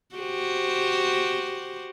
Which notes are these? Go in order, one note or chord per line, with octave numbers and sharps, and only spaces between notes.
F#4 G4 C5